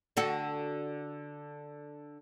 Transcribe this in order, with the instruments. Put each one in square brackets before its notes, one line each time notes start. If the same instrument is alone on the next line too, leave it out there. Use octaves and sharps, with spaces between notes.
[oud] D3 F#4 A4